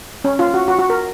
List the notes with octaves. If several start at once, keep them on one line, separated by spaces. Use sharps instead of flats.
C#4
F4
F#4
F#4
F#4
A#4